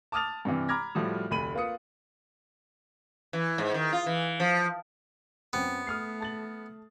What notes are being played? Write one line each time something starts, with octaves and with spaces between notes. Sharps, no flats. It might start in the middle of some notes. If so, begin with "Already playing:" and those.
A5 D6 D#6 F6 A6 F7
G2 C3 E3
A#5 B5 D6 F6 G#6 A#6
A2 F3 G3 F#4
F1 D2 B5 D#7 F#7
A#3 F4 B4 D#6 C#7
E3
G#2
D#3
F4
E3
F3
F#2 B3 C4 G5
A3 D#6 F6 C7
A5 A6 F#7